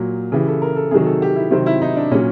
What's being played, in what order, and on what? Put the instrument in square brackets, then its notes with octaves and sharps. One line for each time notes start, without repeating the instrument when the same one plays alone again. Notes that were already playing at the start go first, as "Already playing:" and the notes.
Already playing: [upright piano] A#2 F#3
C#3 E3 G4
A4
A#4
A4
C3 D#3 F#3 G#4
A4
G4
E4
C3 D#3 F#3 C4
E4
D#4
D4
A#2 F#3 C#4